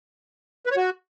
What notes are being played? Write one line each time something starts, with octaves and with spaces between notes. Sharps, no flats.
B4
C#5
F#4